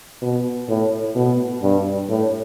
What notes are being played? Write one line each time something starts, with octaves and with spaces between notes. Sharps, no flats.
B2
A2
B2
G2
A2